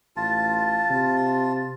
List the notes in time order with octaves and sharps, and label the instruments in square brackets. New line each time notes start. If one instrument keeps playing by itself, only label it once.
[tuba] A1 [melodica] F4 A5
[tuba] C3